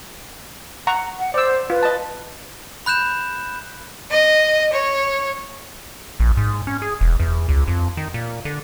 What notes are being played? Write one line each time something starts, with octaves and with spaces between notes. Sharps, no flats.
F#5 A#5 C#6
F#5
C5 D5 E6
F4 B4
D#5 A5
B5 F#6 G6 E7
D#5
C#5
A#1
G#2
C#4
G#4
E1
E2
C#2
F2
D#3
A#2
D3